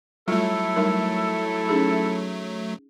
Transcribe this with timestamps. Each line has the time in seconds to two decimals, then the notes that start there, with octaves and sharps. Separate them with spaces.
0.28 F#3 G3 A3 E4 F4 A4
0.76 G3 D#4 A#4
1.69 C#4 D#4 G#4